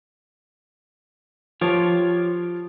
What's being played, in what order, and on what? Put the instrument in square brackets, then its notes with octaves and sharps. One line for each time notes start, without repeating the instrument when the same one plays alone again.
[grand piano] F3 [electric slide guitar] F4 G4 C#5